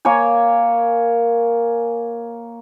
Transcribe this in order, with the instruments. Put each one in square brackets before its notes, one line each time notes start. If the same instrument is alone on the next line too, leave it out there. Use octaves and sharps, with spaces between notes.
[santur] A#3 A#4 C#5 G#5